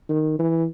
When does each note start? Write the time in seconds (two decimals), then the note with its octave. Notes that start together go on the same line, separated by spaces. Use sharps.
0.09 D#3
0.39 E3